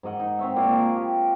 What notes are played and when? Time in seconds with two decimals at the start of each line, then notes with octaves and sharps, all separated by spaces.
0.03 G#2 A#4 D#5 F#5
0.20 D#4
0.39 C4 C#5 E5
0.56 A#2 A#3 F4
0.72 G#4 A#4 A5
0.96 G4